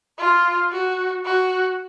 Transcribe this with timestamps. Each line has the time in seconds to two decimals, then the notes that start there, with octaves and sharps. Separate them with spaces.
0.18 F4
0.72 F#4
1.25 F#4